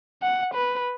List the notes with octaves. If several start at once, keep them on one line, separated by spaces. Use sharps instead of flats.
F#5
B4